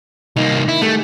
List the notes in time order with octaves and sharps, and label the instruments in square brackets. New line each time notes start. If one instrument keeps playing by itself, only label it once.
[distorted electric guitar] C2 A#3 [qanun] D#3
[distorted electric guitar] E4
[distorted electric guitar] A3 [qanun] G4 G#4 F#5